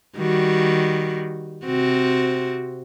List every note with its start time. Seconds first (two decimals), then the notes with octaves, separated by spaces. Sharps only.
0.16 D#3 G3 F#4
1.65 C3 C4 F#4